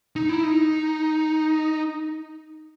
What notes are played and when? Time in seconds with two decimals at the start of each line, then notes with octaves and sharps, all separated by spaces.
0.16 D#4
0.29 E4
0.43 D#4